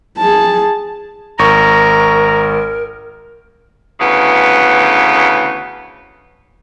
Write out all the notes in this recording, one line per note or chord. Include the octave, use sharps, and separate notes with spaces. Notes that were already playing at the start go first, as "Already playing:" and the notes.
G#4 A5
G#1 A#4 A#5 C#6
D2 C#3 E3 B3